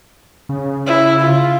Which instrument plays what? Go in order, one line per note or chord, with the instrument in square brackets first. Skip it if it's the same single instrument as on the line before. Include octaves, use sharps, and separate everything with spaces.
[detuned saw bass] C#3
[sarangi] E4
F4